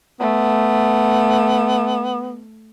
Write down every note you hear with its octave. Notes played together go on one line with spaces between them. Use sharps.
A3 B3